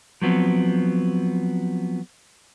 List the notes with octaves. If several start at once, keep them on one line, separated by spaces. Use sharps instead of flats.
F3 F#3 B3 C4